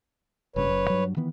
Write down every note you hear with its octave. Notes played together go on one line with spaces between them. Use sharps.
F#1 G2 C#3 B4 C#5
F#1 F#2
G2 F#3
D#3 E3 B3